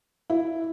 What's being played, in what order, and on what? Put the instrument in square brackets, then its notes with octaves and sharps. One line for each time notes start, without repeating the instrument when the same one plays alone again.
[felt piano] E4